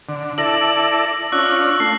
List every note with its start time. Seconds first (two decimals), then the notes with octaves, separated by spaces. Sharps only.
0.09 D3
0.38 E4 A4 D5 A#6 F#7
1.32 C#4 D4 F4 E6 F#6
1.80 A3 C7